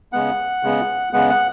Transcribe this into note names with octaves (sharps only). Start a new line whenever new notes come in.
C#3 G#3 B3 F#5
C#3 G#3 B3
C#3 G#3 B3 F#5
F#5